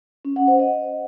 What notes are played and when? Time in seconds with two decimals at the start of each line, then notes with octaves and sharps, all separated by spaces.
0.25 C#4
0.36 F#5
0.48 C5
0.59 D#5